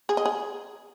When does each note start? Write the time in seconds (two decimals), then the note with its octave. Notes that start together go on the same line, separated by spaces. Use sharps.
0.09 G#4
0.17 D#5
0.25 G#4